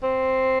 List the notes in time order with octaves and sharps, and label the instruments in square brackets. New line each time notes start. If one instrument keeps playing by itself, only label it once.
[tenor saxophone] C4